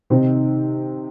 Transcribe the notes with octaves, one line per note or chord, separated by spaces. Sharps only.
C3 D#3 C4 D#4